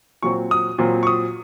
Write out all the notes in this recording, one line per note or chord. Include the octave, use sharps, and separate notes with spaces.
A#2 F#3 C4 C#6
D#6
A#2 F#3 C4
C#6
D#6